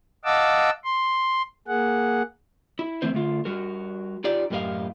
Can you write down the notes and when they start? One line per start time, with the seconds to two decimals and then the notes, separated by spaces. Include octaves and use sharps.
0.25 D#5 F5 F#5 A5 D6 E6
0.84 C6
1.68 A#3 G#4 F#5
2.79 E4
3.02 E3 A3 C4 C5
3.14 D3 A3 F4
3.45 G3 F#4 A#4
4.24 D#4 F4 G4 D5
4.50 F#2 A2 G4 A#4 D#5 F5